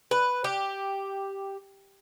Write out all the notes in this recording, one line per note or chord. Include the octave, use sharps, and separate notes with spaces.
B4
G4